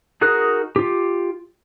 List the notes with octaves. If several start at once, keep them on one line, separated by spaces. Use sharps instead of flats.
D#4 F#4 G#4 A#4 F#6
F4 G4